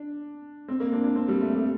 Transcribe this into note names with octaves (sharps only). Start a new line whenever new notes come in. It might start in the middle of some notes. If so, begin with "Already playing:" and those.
Already playing: D4
C4
A#3
D4
D4
C4
G3
A3
A3